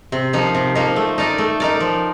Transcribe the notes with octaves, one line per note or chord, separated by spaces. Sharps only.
C3
F3 A#3 D#4
C3
F3 A#3 D#4
A3
D#4 A#4 D5
A3
D#4 A#4 D5
F3